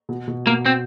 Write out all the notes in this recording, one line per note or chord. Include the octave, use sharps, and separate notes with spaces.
B2
B2
B2 A#3
C4